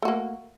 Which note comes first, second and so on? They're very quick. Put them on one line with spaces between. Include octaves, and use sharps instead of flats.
A3 F#4 A#3